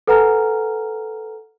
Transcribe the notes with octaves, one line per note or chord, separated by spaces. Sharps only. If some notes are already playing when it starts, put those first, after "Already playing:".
A4 B4 F#5 G#5 A#5 F6